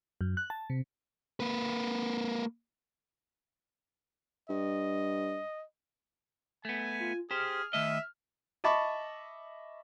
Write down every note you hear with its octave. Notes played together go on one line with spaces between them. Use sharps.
F#2
F#6
A5
C3
A#3 B4
G2 D#5
A3 B3 G#5
F4
G4 G#4 C5 F6
D#3 A3 D#5 E5
D#5 E5 A5 B5 C#6 D6